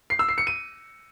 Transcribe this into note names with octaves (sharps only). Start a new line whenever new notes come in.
C7
E6
C7
C#7
D#7